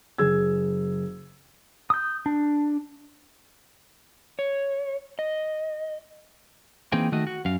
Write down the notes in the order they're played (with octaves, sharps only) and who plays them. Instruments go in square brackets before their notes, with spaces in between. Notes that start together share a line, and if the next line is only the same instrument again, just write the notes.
[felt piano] F#1 G#4 E6 G#6
[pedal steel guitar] D#6 G6
D4
[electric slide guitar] C#5
D#5
[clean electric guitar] E3 A#3 C4 D#4 G#4 G5
D#3 A3 F#4 D#5
F#4
F#2 F5